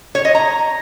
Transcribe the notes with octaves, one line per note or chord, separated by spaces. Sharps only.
C#5
D#5
A#5